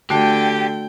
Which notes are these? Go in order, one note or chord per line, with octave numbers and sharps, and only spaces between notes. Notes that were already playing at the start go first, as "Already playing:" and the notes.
D3 A3 F#4 G4 G5